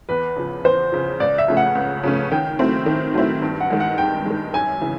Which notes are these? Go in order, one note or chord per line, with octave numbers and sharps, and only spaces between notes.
E2 B4
C#3 F3
E2 C5
C#3 F3
C#2 D5
E5
C#3 F3 A3 C#4
F#5
C#2
C#3 F3 A3 C#4
D#3 G5
F#3 A3 C4 E4
D#3
F#3 A3 C4 E4
G2
F#5
D#3 G#3
F#5
G2 G5
D#3 G#3
F#2 G#5
C#3 E3